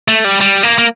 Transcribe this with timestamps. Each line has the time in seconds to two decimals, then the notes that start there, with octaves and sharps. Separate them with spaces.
0.08 A3
0.24 G3
0.41 G3
0.63 A#3
0.78 A#3